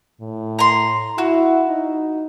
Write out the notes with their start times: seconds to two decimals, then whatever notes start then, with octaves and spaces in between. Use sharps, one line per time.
0.21 A2
0.59 A#5 C6
1.18 E4 F#4
1.68 D#4